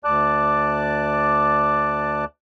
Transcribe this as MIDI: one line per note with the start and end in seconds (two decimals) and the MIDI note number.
0.04 2.25 38
0.04 2.25 74
0.04 2.25 81
0.04 2.25 86
0.04 2.25 90